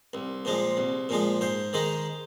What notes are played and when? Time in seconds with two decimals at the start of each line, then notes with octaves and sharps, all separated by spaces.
0.13 C2
0.45 A#2 F3 G#3
0.77 C2
1.09 A#2 F3 G#3
1.41 G#2 C5
1.73 D#3 G#3 D#4